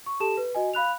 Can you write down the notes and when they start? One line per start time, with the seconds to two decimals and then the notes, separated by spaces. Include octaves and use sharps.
0.06 C#6
0.20 G4 A4 A5 E7
0.37 B4
0.55 F#4 D#5 G#5
0.74 F5 B5 F#6 F7